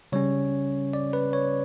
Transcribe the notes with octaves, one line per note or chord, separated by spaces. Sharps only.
C#3 G3 C#4 C#5
D5
B4
C#5